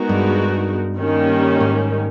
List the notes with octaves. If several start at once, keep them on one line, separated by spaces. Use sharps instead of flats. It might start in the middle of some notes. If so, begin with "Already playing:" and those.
Already playing: G#3 B3 D#4 F#4 A#4
G2
D#3 G3 A#3 C#4
G#2